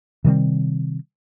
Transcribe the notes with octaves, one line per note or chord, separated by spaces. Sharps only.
C3 D#3 G3 C4